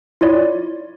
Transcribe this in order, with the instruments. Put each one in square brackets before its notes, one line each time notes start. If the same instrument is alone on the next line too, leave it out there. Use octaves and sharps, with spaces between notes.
[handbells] E4 F4 C#5 D5